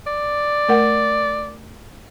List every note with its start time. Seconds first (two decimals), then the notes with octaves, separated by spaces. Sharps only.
0.07 D5
0.69 A3 A#4 F#5